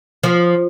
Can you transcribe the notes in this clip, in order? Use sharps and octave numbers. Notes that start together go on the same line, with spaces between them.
F3